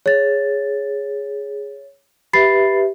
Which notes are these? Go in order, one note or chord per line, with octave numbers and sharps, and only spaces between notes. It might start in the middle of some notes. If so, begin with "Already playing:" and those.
G#4 C#5 A6
G4 B4 E5 B5 A6 C7